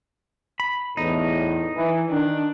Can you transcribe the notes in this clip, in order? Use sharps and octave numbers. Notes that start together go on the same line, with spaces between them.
B5
E2 A2 D#4
E3
D#3 D4